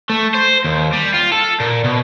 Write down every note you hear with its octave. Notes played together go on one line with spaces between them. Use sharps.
A3
C5
D#2
G3
F4
A4
A#2
B2